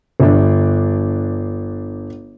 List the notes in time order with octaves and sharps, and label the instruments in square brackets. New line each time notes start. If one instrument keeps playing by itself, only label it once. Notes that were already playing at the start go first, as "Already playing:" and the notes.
[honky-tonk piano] G1 D4